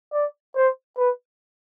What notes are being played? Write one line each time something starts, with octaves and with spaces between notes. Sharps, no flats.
D5
C5
B4